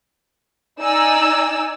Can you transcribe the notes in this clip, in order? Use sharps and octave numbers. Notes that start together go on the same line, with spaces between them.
D#4 D5 G#5 E6